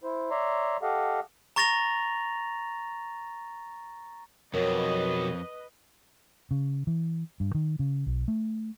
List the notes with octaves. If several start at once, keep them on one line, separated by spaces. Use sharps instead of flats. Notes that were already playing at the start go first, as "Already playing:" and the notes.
E4 C5
C#5 D5 E5 A#5 C6
G4 A4 D#5 F5 F#5
A#5 C#6 A6 A#6 F7
F2 B2 F#3 A#4 B4 C#5 D#5
C#3
E3
G2
D#3
C#3
B1
A3